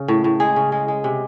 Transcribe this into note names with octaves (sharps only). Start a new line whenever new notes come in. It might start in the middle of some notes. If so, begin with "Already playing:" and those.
Already playing: C#3
A2
A2
G#3 G#4
C#3
G#3
G#3
C3